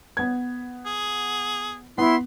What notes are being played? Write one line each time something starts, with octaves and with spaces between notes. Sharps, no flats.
B3 G#6
G#4
B3 E4 C6